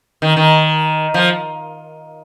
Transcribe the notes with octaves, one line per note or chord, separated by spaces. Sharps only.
D#3
D#3
F3